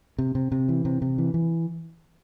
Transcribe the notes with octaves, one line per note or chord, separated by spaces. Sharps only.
C3
C3
C3
E3
C3
C3
E3
E3